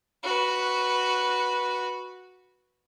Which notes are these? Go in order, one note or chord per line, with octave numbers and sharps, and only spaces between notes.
F#4 B4